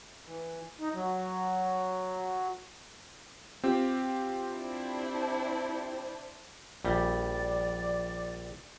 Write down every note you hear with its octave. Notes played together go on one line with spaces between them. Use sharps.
E3
D#4
F#3
C4 F4 G4
D4 E4 C5
A#1 G3 D5